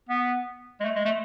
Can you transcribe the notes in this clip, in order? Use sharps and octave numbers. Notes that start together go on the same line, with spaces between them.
B3
G#3
A3
G#3
A3